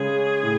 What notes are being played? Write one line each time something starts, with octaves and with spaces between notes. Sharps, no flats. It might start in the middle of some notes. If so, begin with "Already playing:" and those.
Already playing: C#3 G#3 C#4 G#4
A2